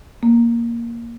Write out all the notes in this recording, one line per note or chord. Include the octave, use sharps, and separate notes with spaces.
A#3